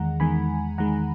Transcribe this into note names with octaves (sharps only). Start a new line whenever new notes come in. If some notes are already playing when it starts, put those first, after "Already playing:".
Already playing: E2 D#3 G#3 F#5 A#5
E2 D#3 G#3 G#5 B5
E2 D#3 G#3 F#5 A#5